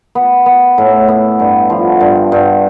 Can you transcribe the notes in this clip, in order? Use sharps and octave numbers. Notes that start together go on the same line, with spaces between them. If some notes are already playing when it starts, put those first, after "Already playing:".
B3
B3
A2
B3
G2
F3
G2
G2